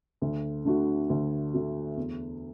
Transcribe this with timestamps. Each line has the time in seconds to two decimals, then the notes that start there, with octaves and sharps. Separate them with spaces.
0.22 D2
0.65 D3 A3 D4 F#4
1.10 D2
1.53 D3 A3 D4 F#4
1.97 E2